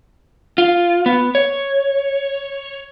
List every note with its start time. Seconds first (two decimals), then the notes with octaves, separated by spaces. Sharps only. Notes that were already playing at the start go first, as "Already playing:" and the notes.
0.58 F4
1.06 B3
1.35 C#5